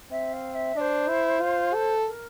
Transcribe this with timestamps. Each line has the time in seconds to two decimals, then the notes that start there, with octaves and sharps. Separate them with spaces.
0.11 C4 E5
0.33 F5
0.54 E5
0.76 D4 D5
0.80 C5
1.09 E4
1.41 F4
1.74 A4
2.07 A#4